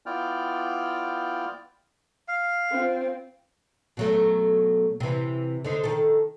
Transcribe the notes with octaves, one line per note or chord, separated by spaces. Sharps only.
B3 E4 F4 D5 G5 F6
F5
C4 F4
B2 F#3 A3
C3 E3
D3 D#4 C5
D#3 A4